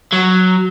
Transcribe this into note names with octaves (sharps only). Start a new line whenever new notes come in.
F#3